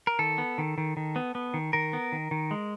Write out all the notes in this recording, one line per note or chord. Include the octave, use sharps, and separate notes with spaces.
A#4
D#3 A4
B3
D#3
D#3
D#3
B3
B3
D#3
D#3 A#4
B3
D#3
D#3
G#3